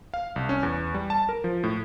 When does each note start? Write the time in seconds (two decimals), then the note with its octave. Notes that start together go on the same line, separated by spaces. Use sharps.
0.14 F5
0.36 C2
0.49 C#4
0.63 E2
0.94 G3
1.10 A5
1.29 A#4
1.44 F3
1.64 A2